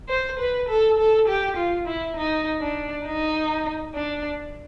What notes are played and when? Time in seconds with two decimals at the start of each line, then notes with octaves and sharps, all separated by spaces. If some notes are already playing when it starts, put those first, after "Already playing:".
0.09 C5
0.39 B4
0.69 A4
0.98 A4
1.28 G4
1.57 F4
1.87 E4
2.17 D#4
2.61 D4
3.06 D#4
3.94 D4